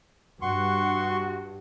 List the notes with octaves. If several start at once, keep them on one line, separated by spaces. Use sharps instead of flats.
G2 F#4 F#5 C6 C#6